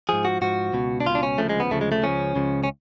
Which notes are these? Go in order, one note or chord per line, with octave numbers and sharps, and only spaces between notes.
G#2 F3 G#4
F#4
G#2 F3 F#4
C#2 B2
D4
C#2 B2 F4
D4
C#4
D2 C#3 F3 A3
G#3
B3
D2 C#3 F3 A3
G#3
A3
C#2 C#3 F3 C#4
C#2 C#3 F3
C#4